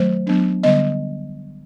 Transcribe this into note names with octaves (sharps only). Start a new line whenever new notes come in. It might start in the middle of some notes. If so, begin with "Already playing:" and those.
Already playing: D#3 F#3 A3 C5
F#3 B3 D4
D3 G3 B3 D#5